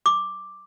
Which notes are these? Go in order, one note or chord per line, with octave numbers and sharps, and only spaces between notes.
D6